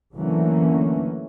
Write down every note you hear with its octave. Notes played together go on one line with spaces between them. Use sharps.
D3 E3 F#3 A3 A#3 C#4